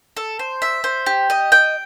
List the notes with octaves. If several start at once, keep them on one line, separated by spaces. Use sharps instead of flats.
A4
C5
E5
C5
G4
D#5
G5